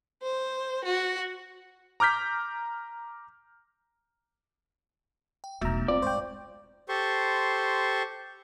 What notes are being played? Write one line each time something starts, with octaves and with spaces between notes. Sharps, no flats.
C5
F#4
A#5 D6 F6 G6 B6
G5
E1 B1 A3 B3 F#4 E5 A#5
G2 C4 F4 D5
G#2 C5 F5 G5 C#6
G4 A4 C5 C6 C#6